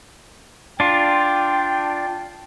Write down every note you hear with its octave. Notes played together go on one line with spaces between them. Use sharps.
D4 F4 G5